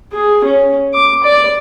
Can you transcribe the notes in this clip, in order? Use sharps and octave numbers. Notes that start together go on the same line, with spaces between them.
G#4
C#4
D6
D5